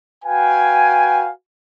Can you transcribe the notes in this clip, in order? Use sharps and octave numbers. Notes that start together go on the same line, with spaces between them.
F#4 B4 F5 G5 G#5